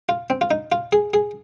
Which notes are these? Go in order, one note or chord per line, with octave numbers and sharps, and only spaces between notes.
F4
C4
F4
D#4
F4
G#4
G#4